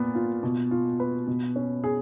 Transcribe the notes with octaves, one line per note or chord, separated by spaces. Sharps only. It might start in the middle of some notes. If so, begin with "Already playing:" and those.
Already playing: A#2 B3
F4
B2
F4
B4
B2
C#4
G#4